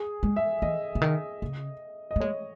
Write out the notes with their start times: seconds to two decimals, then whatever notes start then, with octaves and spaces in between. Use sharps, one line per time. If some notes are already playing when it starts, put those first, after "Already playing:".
Already playing: G#4
0.23 G#3
0.36 E5
0.62 E3 D#5
0.95 C#3
1.01 D#3
1.42 C#3
2.11 D#5
2.16 A3
2.20 G#3 C#5